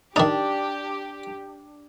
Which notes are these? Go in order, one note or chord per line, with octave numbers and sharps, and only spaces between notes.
D#3 D4 D#4 G4